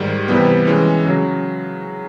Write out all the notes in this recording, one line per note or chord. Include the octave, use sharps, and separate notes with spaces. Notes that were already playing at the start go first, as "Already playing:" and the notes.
Already playing: G#2 D#3 G3
C3 E3 G3 B3
E3 G#3 C#4
C#3 F#3